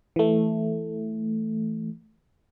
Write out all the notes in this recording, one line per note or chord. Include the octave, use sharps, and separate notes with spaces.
E3 A3